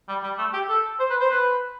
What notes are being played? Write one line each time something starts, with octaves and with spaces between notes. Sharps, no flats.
G3
G3
A3
G4
A4
C5
B4
C5
B4